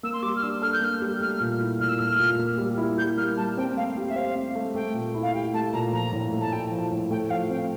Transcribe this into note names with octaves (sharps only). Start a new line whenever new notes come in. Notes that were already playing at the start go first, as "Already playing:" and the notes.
A#3 E6
C6
G3 D6
F6
D4 E6
A4 F6
G6
A#3 F6
G3
A3 F6
A#2
E4
A#2 F6
E6
A3 F6
A#2
A#3
G3
E4
G3 G6
A#3 F6
G3 A5
C4 G5
A3 F5
G4
E5
C5 F5
C4
A3
A3 G5
A#2
E4
F5
G4 G5
A3 A5
A#2 A#5
F3 A#5
A2
A3
A5
E4 G5
F3
A2
A3 G5
G5
F3 F5
C4 G5